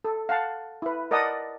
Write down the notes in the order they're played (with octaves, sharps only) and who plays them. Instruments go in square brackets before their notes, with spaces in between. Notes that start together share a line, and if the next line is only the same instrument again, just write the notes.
[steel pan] A4
F5 F#5 A5
E4 B4
A#4 D5 D#5 F#5 A5 D#6